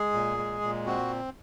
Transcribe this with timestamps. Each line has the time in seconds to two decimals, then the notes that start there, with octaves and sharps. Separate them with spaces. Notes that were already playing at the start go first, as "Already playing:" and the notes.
Already playing: G#3 G#4
0.13 A#2
0.37 G#3
0.61 A#2
0.86 C4 F#4